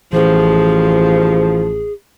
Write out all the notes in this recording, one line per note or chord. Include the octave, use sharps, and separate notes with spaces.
A1 E3 F3 G#4